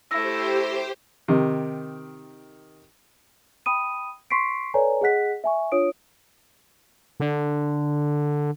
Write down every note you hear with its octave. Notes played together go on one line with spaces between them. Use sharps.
A3 E4 G4 C5 E6 A#6
C3 D#3
G5 B5 D#6 D#7
C6 C#6 B6 C7 D7
A4 B4 C#5 D5 G#5 A#5
G#4 D#5 F#5 F#6 B6
E5 G#5 C#6
D4 F4 C#5 D#6 D7
D3